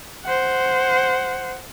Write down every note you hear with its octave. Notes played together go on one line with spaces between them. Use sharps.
C5 F#5